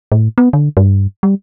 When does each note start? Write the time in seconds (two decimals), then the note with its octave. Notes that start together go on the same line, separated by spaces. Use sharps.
0.12 A2
0.38 B3
0.53 D3
0.77 G2
1.23 G3